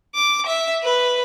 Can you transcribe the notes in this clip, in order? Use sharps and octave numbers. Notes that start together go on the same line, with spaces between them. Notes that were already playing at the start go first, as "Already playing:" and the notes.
D6
E5
B4